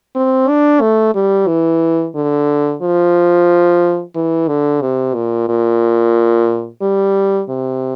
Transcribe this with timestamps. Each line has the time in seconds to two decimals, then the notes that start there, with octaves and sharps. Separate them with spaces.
0.15 C4
0.49 D4
0.81 A3
1.15 G3
1.48 E3
2.15 D3
2.82 F3
4.16 E3
4.48 D3
4.82 C3
5.15 A#2
5.49 A#2
6.82 G3
7.49 C3